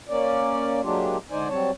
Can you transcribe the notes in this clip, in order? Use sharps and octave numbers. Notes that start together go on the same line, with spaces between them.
A#3 C#4 D5
F#3 G#3 A#3 D4 F4 G4
D3 G#3 D#4 C5 D5 G#5
F#3 G3 C4 C#5 A5